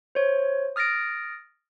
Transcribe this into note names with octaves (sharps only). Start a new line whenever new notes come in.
C5 C#5
D#6 F6 A6 A#6 D7